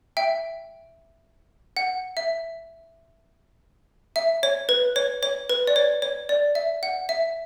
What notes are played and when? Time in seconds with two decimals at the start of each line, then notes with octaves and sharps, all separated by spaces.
0.17 E5 G5
1.77 F#5
2.17 E5
4.16 E5
4.43 C#5
4.69 B4
4.96 C#5
5.23 C#5
5.50 B4
5.67 D5
5.76 C#5
6.02 C#5
6.29 D5
6.55 E5
6.83 F#5
7.09 E5